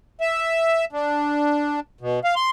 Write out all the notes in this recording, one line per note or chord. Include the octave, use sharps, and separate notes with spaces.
E5
D4
B2
F5
C6